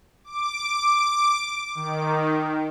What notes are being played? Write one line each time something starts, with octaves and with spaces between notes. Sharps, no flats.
D6
D#3